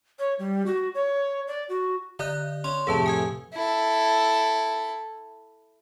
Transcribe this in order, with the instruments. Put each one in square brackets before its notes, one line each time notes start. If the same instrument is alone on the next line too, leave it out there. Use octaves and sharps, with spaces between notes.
[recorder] C#5
G3
F#4
C#5
D5
F#4
[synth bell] D3 D5 F#6 [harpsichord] D#5
[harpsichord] C#4 [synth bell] C6
[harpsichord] F2 A2 C3 [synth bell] G#4 B4 A5
[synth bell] G#5 D#6 G#6
[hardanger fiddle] E4 A4